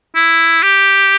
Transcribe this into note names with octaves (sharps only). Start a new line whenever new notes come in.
E4
G4